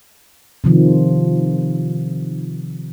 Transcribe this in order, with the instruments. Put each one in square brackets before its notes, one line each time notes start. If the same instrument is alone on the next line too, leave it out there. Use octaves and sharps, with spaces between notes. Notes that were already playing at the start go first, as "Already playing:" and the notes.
[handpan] C3 D#3 F3